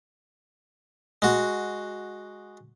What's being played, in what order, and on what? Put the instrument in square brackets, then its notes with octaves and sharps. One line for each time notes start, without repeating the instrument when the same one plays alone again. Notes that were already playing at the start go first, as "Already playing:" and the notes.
[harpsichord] G#3 F#4